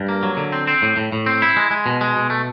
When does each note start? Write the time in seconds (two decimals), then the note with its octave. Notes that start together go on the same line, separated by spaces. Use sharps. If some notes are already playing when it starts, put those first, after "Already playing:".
Already playing: G2
0.09 A#3
0.23 F#3
0.37 D3
0.52 C4
0.67 C4
0.82 A2
0.97 A2
1.12 A2
1.26 C4
1.42 E4
1.57 G#3
1.71 G#3
1.86 B2
2.01 G#3
2.16 B2
2.30 A3